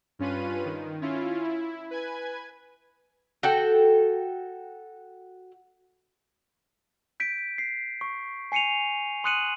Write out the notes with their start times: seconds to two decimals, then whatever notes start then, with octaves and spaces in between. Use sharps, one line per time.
0.19 G2 C#4 F4 B4 D#7
0.65 D#3
1.02 C#4 E4 F4
1.44 E4
1.91 B4 G#5 G#6
3.43 F#4 A4 G5
7.20 G6 B6 D7
7.58 C7
8.01 C#6
8.52 G#5 C7 C#7 D#7 F7
9.24 C6 D#6 F#6 C#7 D#7 F#7